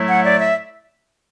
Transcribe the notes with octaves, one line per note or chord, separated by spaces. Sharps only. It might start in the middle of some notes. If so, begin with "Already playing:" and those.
Already playing: A2 F#3 A3 E4
F#5
D5
E5